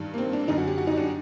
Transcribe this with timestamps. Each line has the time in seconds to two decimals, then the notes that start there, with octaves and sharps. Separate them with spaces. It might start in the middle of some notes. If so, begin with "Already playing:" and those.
Already playing: G2 D#3
0.14 A#3
0.18 C4
0.33 D4
0.48 F#2 D3 D#4
0.58 F#4
0.68 G4
0.78 F#4
0.87 D#4
0.97 D4